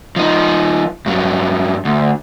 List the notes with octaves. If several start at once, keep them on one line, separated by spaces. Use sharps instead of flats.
F3 D#4
G2 F#3
D2